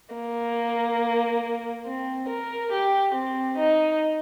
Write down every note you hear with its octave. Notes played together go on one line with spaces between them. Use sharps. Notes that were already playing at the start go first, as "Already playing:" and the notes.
A#3
C4
A#4
G4
C4
D#4